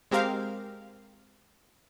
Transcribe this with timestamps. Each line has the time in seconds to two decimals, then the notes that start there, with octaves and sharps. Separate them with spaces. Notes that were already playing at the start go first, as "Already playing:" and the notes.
0.11 G#3 C4 G4 A#4 F5